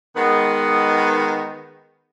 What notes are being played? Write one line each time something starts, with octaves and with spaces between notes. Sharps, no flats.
D#3 G#3 B3